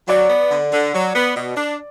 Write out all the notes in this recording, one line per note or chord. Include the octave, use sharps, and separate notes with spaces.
F#3 D5
B3
D3
D3
F#3
B3
B2
D4